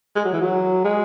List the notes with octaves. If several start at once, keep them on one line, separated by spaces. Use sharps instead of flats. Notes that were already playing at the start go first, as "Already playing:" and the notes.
G#3
F#3
E3
F#3
G#3